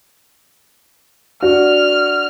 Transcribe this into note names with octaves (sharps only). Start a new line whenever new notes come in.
D4 F#4 F6